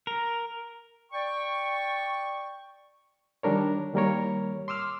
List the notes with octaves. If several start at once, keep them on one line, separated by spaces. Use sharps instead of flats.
A#4
D5 G5 C#6
D#3 G3 D4 A#4 C#5
D#3 G3 A#3 A#4 C#5
C6 D6 E6 F6